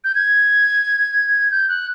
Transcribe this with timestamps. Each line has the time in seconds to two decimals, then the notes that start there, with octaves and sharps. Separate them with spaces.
0.04 G6
0.15 G#6
1.51 G6
1.69 F#6